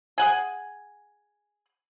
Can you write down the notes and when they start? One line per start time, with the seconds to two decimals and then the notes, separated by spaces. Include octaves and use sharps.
0.18 G#4 F#5 G#5